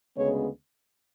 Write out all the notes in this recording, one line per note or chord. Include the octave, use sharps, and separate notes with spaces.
D2 C#3 G#3 B3 C#5